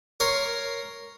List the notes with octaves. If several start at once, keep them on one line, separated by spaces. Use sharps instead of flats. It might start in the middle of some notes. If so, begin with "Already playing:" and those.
A#4 C#5 C6